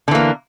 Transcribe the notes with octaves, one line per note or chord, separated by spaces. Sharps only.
D3 E3 A#3